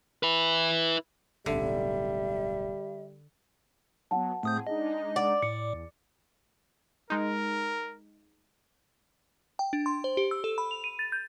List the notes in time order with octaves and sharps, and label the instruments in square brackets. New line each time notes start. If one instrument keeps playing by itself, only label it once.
[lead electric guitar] E4 B4
[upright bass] D1 B1 [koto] D3 [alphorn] G3 [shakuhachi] E5
[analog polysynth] F#3 B3 [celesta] F#5 A5
[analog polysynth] A2 C4 G#4 [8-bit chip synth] A3 D#6 G6
[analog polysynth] G#3 D4 D#4 [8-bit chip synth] D#5
[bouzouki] D5 [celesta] F#5
[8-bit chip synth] A2 [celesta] C#7
[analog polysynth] E2
[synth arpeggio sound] G#3 D#4 [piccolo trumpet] A#4
[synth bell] G5
D4
C6
C5
G4
E6
A4
B5
F7
D#7
A6
G6